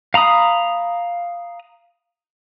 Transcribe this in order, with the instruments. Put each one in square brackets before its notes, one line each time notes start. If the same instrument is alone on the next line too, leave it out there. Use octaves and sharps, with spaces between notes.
[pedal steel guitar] F5 A#5 B5 D#6